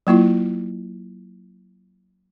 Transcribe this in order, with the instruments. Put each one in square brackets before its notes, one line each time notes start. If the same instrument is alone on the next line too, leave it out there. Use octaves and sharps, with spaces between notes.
[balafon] F#3 A#3 E4 F4